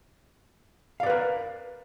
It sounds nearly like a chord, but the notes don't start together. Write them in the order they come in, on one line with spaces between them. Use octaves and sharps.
F5 D5 B4 A#4